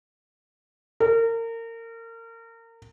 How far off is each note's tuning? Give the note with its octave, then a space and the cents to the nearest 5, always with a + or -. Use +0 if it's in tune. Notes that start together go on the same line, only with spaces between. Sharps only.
A#4 -30